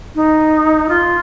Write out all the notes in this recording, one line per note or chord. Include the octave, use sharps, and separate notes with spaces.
D#4
F4